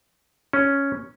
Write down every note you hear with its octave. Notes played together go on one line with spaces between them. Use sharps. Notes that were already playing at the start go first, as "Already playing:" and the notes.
C#4